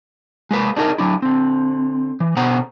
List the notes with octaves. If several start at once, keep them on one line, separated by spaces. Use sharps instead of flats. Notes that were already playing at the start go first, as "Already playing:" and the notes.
G#3 A#3 B4
D4 D#4 G#4 A#4 D#5
F#3 D4 E4
D3 C4
E3
B2 D3 B3 C5 F#5 A#5